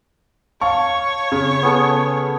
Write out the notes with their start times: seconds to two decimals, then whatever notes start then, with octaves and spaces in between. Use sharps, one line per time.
0.61 C#5 F5 A5 C#6
1.32 C#3
1.63 B3 G#4 A4